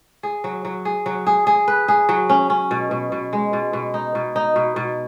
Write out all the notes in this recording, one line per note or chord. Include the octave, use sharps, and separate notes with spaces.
G#4
F#3
F#3
G#4
F#3
G#4
G#4
B4
G#4
F#3
C#4
C#4
B2
B2
B2
G#3
B2
B2
D#4
B2
D#4
B2
B2